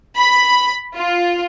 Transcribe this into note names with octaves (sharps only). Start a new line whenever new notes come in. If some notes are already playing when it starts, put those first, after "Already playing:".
B5
F4